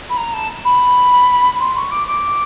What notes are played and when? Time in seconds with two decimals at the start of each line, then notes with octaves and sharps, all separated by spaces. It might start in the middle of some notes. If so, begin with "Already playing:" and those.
0.09 B5
0.17 A#5
0.33 A5
0.65 B5
1.60 C6
1.76 C#6
1.91 D6
2.07 D6